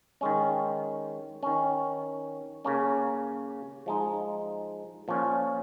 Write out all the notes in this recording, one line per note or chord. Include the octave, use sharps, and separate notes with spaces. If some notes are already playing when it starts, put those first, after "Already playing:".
D#3 G#3 C#4
D#3 C#4
C#3 A#3 C#4
F3 G#3 D#4
A#2 F3 C#4